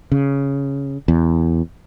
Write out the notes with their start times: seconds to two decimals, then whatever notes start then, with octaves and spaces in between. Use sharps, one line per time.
0.12 C#3
1.08 E2